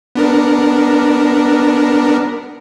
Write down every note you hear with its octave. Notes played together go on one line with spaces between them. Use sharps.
B3 D4 A#4